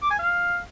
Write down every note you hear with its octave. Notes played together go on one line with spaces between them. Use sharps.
D6
G#5
F5